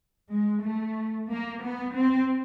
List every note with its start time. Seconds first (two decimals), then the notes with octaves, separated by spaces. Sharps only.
0.31 G#3
0.64 A3
1.29 A#3
1.63 B3
1.94 C4